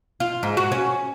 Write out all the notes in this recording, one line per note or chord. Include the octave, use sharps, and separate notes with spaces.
F4
G#2
F#4
C#4